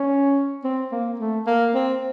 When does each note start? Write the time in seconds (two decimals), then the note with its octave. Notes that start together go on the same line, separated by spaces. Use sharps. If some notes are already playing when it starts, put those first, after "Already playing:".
Already playing: C#4
0.64 C4
0.92 A#3
1.20 A3
1.47 A#3
1.74 C4